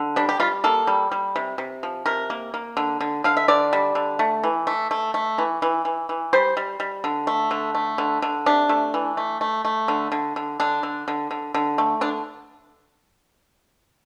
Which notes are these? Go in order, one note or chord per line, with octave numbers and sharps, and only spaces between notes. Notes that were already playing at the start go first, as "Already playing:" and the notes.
Already playing: D3
G3 D4
G4
G3 F4
A#3 A4
G3
G3
C3
C3
F3
C3 A#4
A#3
A#3
D3
D3
D3 F5
E5
D3 D5
G3
D3
A3
E3
A3
A3
A3
E3
E3
E3
E3
G3 C5
G3
G3
D3
A3
D3
A3
D3
D3
C3 D4
A3
E3
A3
A3
A3
D3
D3
D3
D3 D4
D3
D3
D3
D3
A3
D3 D4